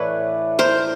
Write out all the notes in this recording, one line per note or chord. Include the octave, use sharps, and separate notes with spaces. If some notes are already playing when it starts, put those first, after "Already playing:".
Already playing: A2 E3 A3 D4 B4 C#5
A#4 C5